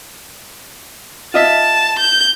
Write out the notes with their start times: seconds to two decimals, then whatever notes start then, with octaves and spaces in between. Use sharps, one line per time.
1.34 F4 D#5 E5 A5
1.99 G6